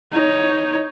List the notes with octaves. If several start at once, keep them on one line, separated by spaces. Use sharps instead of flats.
D#4 C#5